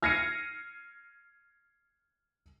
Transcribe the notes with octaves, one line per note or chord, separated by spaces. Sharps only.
F6 G#6 A#6 C7 C#7 D#7